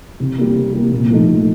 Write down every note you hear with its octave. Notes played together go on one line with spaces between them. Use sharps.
C3
G3 A#3
C3
G3 A#3
A#2
F3 A3 D#4
A#2